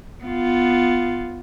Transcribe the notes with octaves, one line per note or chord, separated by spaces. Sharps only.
B3 F4